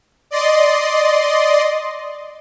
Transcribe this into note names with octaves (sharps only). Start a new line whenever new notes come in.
D5 D#5 C6